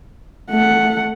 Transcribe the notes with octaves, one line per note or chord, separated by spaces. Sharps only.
A3 F#5